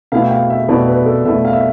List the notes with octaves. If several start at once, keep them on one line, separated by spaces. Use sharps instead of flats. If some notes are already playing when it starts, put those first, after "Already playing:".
B2 A3 E4 F5
G5
F5
E5
B2 A3 E4 D5
B4
A4
B2 A3 E4 E5
F5
E5